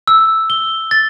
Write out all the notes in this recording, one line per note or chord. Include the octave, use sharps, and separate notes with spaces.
E6
G7
A6